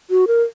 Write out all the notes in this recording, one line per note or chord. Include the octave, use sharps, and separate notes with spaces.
F#4
A#4